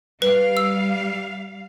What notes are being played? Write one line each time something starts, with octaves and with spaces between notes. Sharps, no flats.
G3 B4 F5
E6